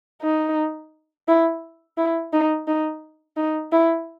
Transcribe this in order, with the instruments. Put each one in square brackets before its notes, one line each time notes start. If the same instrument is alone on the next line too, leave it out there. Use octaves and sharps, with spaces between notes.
[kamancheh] D#4
E4
E4
D#4
D#4
D#4
E4